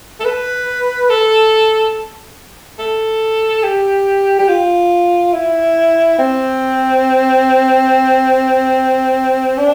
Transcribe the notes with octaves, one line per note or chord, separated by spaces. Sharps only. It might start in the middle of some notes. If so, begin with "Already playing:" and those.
A4
B4
A4
A4
G4
G4
F4
E4
C4
D4